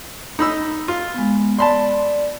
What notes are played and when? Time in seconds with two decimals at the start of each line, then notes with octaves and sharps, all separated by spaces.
0.39 D#4 B5 E6
0.88 F4
1.14 G#3 B3
1.59 D5 A5 B5 C6